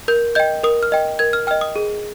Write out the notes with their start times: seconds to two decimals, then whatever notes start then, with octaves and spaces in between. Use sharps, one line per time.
0.08 A#4 G6
0.35 D#5 G5 G6
0.63 A#4 D#6
0.83 F6
0.92 D#5 G5
1.19 A#4 G#6
1.33 F6
1.47 D#5 G5 F6
1.61 D#6
1.76 G#4